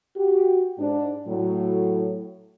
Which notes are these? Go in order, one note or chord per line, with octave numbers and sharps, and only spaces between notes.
F#4 G4
G#2 D4
A2 F#3